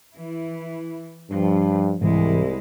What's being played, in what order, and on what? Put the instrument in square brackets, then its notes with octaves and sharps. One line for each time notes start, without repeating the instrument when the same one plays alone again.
[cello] E3 E4
[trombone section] G2 [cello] F3
[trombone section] C2 [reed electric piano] G#2 E3 [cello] G#3 E4